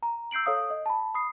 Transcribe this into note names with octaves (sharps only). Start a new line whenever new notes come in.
A#5
E6 G6 C7 D7 F#7
A4 C#5 F5 D#6
D#5
A5 B5
B5 D#6 C7